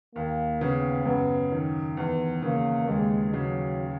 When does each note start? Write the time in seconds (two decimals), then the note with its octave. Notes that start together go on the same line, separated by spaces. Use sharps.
0.15 D#2 A#3
0.61 C#3 B3
1.06 F#2 B3
1.52 D#3
1.97 E2 B3
2.42 C#3 A#3
2.88 D#2 G#3
3.33 C#3 F#3